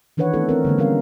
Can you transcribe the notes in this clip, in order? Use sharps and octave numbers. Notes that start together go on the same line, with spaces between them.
D#3 E3 D4 B4 C#5 F#5
A3 B3 C4 D4 E4 A4
C4 A#4
D3 G#3 A#3
G3 C4 C#4 A#4 F5